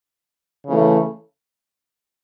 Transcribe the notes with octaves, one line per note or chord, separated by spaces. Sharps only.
C#3 E3 A3